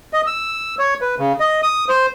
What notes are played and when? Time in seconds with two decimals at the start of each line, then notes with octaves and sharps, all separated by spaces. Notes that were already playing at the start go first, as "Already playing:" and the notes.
0.13 D#5
0.27 E6
0.79 C#5
1.01 B4
1.19 C#3
1.40 D#5
1.63 D#6
1.89 C5